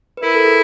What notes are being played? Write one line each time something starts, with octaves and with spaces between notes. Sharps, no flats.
B4
E4 A#4
A4
G#4